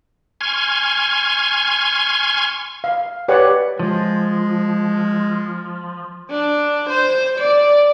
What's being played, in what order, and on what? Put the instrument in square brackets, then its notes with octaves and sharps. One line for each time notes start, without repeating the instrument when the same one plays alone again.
[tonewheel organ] G#5 C6 C#6 F6 G#6
[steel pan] F5
G4 B4 C#5 D5 F#5
[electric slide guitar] F3 [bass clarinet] G#3
[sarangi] D4
C5
D5